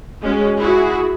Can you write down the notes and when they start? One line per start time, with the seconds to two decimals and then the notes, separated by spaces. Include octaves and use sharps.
0.21 G#3 C#4 F#4
0.57 E4 F#4 G#4